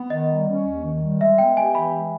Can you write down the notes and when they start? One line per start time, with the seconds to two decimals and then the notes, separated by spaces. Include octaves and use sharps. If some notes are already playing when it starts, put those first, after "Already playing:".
Already playing: B3
0.10 D#3 D#5
0.28 G3
0.48 C#4
0.66 D#2
0.83 D#3
1.02 G3
1.21 G#3 E5
1.38 B3 G5
1.57 G4 G#5
1.74 E3 B5
1.93 G#3